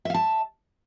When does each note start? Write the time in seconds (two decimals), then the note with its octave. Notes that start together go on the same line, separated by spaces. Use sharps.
0.05 E5
0.10 F5
0.14 A5